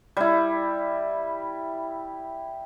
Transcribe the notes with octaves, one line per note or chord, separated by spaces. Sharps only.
G3 E4